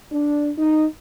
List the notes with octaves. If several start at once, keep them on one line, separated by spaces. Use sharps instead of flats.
D4
D#4